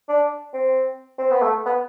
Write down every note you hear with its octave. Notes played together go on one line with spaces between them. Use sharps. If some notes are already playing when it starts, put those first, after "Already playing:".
D4
C4
C4
B3
A3
B3